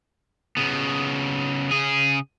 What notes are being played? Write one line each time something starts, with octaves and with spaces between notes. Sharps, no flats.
C#3 B3
C#3 G#4